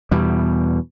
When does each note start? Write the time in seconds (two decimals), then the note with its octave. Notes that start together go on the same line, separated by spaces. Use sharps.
0.11 E2 B2 G3